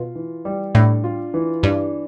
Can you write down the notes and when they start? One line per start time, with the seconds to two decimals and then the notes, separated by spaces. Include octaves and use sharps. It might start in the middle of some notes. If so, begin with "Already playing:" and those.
Already playing: B2 F4
0.15 E3
0.45 G3
0.75 A2 D4
1.04 F4
1.34 E3
1.63 G2 D4